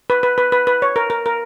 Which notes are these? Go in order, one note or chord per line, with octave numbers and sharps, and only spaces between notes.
B4
B4
B4
B4
B4
C#5
A#4
A#4
A#4